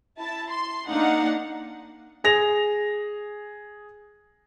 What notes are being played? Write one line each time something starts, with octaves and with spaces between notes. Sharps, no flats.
E4 A5
C6
A#3 D4 D#4 F5 F#5
G#4 A#6 F7